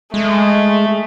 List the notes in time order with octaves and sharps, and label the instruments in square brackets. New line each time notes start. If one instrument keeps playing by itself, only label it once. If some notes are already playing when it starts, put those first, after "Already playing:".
[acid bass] G#3 [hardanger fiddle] A3